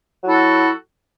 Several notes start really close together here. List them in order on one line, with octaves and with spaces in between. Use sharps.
F#3 E4 A4 F#4